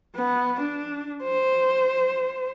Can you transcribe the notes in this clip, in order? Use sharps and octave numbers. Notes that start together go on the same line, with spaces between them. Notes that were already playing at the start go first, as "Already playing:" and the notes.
B3
D4
C5